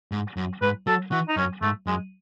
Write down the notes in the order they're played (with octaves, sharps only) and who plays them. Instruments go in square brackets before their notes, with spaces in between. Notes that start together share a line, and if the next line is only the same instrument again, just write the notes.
[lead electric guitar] G#2
F#2
[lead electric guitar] G#2 [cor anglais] B4
[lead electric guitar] F#3 [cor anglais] A4
[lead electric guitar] E3 [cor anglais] F#4
[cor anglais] D#4
[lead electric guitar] F#2 [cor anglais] C#4
[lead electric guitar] G#2 [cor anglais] A3
[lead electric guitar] F#2 [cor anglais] G#3